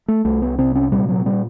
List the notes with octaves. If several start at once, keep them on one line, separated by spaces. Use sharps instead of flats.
A3
C2 A3
B3
C3 C4
C#4
A#2 G3
F#3
G3